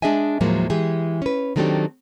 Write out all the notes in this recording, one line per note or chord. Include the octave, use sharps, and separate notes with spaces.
G#3 D4 G#4 D#5 E5 G#5
D#2 A2 F3 F#3 G#3 A#3
E3 G#3 G4 G#4
C#4 B4
D#3 F#3 A3 C4 D4 G4